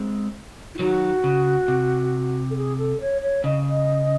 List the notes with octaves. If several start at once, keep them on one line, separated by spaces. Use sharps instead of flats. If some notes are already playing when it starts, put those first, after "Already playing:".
Already playing: G#3 C4
E4
D#3 F#3 F#4
C#3
C3
A4
G#4
A4
C#5
C#5
C#3 D#5
D#5